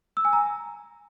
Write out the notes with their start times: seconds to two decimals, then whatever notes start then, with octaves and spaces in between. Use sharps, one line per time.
0.17 E6
0.25 G#5
0.33 A#5